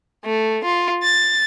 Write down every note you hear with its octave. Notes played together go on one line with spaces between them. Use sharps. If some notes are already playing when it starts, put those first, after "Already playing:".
A3
F4
A6